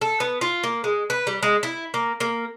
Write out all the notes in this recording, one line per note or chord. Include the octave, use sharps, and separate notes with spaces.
A4
B3
F4
A#3
G#3
B4
G3
G#3
E4
A#3
A#3